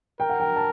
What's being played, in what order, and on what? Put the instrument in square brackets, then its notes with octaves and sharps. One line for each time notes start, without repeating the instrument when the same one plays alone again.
[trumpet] A#4 [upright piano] G5
[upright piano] F#5
G5
A5